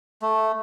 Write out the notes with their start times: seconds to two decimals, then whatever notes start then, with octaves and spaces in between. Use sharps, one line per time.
0.22 A3